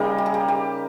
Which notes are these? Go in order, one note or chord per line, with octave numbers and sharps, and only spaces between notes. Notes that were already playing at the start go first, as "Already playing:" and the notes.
Already playing: C#3 G3 A#3 D#4
G4
G#4
G4
G4